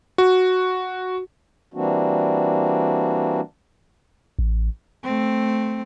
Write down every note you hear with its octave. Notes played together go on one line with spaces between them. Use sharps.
F#4
E3 G3 A#3 C4 D4 F#4
A1
A3 C4